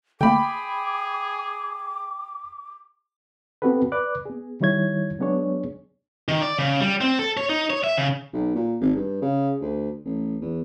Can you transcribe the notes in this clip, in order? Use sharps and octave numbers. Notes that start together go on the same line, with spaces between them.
D3 A3 A#3 G#4 G5 B5 D6
B3 C4 F#4 G4 A4 B4
B4 D5 D6 F#6
B3 G#4
D#3 G3 E4 C#5 G#6
F#3 G#3 B3 D4 G#4 C#5
D#3
D5
C#3
G3
C4
A4
C#5
D#4
C#5
E5
C#3
B1
A#2
G#1
G2
C#3
D2
A1
E2